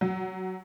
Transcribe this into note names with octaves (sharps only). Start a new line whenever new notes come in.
F#3